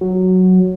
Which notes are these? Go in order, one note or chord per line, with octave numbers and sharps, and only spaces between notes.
F#3